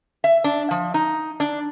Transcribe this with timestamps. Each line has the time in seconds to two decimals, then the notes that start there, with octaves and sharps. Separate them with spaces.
0.24 E5
0.44 D4
0.71 F3
0.94 D#4
1.40 D4